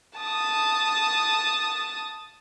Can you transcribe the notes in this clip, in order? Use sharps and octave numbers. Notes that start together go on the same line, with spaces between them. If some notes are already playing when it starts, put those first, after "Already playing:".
A5 D#6